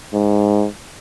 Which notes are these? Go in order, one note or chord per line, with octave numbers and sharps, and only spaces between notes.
G#2